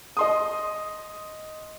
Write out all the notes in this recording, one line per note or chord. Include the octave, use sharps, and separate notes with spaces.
D#5 C6 D#6